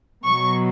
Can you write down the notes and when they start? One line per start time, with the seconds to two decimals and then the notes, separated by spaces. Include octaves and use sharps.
0.24 B2 F#3 C#6